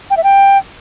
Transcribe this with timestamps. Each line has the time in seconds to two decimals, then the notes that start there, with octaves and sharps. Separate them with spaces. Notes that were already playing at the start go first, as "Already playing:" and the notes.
0.10 G5
0.17 E5
0.24 G5